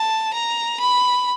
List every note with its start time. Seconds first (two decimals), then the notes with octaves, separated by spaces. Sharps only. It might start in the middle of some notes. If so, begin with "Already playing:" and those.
Already playing: A5
0.34 A#5
0.80 B5